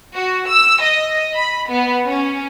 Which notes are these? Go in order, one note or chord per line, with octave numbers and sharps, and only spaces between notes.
F#4
E6
D#5
B5
B3
C#4